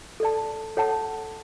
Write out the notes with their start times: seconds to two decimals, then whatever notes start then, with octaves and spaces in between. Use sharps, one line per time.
0.20 A4 D5 A5
0.77 A4 C#5 F#5 A5